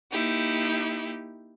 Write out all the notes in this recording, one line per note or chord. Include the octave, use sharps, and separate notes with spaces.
A#3 D#4 E4 G4